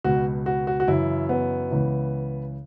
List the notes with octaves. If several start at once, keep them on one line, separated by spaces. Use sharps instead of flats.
C#2 B2 F#4
F#4
F#4
F#4
F#2 C#3 E3 E4
B3
C#2 C#3 E3